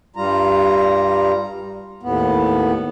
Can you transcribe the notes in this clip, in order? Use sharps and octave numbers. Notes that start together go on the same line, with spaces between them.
G2 G3 F4 A#5
D#2 A2 B3